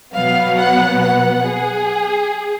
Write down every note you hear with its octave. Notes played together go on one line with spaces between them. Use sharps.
B2 F#3 B3 F5
F#5
F#5
G#4